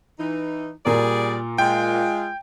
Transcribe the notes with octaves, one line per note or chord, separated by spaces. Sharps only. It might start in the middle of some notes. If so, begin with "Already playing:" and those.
E3 D#4
A#2 G3 G#4 A#4 D5
G#3 F4 G5